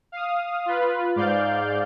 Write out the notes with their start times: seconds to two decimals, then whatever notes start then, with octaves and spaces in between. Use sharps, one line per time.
0.12 F5 D#6
0.66 F4 B4
1.16 G#2 D5 F5 G6